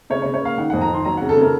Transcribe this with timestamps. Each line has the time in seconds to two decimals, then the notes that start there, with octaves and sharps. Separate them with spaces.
0.10 C#3 C#5
0.22 C#5
0.25 C#3
0.34 C#5
0.42 A#3 F5
0.58 D#3 F#5
0.70 F#5
0.74 F2
0.81 A#5
0.90 D#3 C6
1.05 F#3 A#5
1.17 F#5
1.21 C#3
1.29 A4
1.37 C#3 A#4